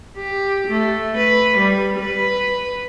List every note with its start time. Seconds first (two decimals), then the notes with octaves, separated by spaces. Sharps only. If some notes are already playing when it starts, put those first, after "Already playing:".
0.17 G4
0.68 A3
1.17 B4
1.58 G3
2.00 B4